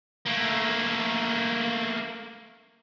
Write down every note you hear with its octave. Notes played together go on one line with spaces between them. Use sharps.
A3 A#3